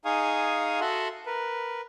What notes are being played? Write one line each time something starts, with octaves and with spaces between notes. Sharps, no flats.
D#4 G#4 F5 G#5 C#6 D#6
F#4 A4 E5 F#5 C6
A#4 B4